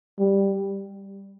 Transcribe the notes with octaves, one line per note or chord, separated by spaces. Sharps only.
G3